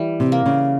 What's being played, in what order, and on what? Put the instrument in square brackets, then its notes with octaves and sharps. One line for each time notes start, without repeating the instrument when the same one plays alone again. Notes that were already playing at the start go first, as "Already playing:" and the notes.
Already playing: [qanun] E3 G3
[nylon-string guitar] C3
[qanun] A#3
[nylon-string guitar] C#3